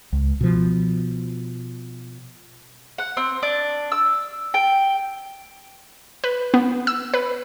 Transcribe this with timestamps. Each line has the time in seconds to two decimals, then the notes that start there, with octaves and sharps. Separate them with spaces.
0.13 C#2
0.41 B2 F3
2.98 F#5
3.17 C4
3.43 D4
3.92 E6
4.54 G5
6.24 B4
6.54 B3
6.87 E6
7.14 B4